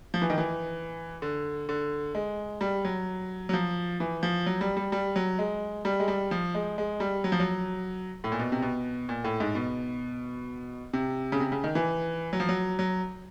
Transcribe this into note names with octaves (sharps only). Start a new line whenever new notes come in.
F3
E3
D#3
E3
D3
D3
G#3
G3
F#3
F#3
F3
E3
F3
F#3
G3
G3
G3
F#3
G#3
G3
G#3
G3
F3
G#3
G#3
G3
F#3
F3
F#3
A2
A#2
B2
C3
B2
A#2
A2
G#2
B2
C3
C#3
C3
C#3
D#3
E3
F#3
F3
F#3
F#3